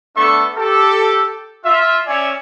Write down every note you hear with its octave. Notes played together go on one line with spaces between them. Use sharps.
A3 B3 D4 A4 E5 C#6
G4 A4
F4 E5
C#4 C#5 D5 E5 G#5